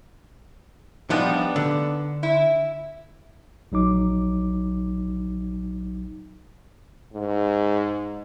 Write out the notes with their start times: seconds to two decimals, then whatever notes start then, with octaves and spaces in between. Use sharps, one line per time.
1.10 F3 G3 B3 D4 D#4
1.56 D3
2.23 E4
3.72 A#1 F#3 D#4 D6
7.13 G#2